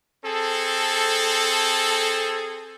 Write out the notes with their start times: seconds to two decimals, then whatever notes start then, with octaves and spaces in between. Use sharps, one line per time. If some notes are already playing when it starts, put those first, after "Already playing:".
0.24 C4 G#4 A4